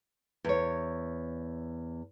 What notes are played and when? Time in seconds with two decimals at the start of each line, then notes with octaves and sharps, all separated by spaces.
0.44 E2 C#5